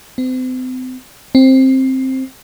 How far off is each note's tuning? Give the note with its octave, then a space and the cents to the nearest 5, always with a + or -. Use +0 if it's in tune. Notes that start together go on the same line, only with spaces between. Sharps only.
C4 -40
C4 +10